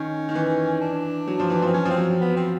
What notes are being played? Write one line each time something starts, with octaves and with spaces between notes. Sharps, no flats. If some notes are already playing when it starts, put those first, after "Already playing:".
Already playing: D#3 C#4
D#3
E3
D4
F#3
F3
E3
F3
C4
F#3 C#4
F3
C4
F#3
B3
C4